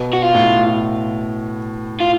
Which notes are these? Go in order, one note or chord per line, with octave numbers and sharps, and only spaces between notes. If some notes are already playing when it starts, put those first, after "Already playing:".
Already playing: B2
F#4
F4
A2
F4